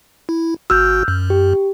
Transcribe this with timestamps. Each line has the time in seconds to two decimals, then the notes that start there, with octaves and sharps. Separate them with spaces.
0.29 E4
0.70 G1 F#4 E6 F6 G6
1.08 F#2
1.30 G4